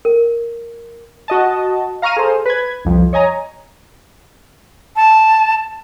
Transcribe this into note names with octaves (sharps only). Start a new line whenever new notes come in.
A#4
F#4 D#5 A5
F5 A#5 C#6 F6 D#7
G#4 A4 C5
B4 G#6
C2 F2 F3
C#5 D#5 G#5 A#5
A5